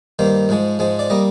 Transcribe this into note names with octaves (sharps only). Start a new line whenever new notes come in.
G2 D#3 A#3 C5
G#2 F3 G#3
G#2 F3 G#3
D5
G3 A#3 D#5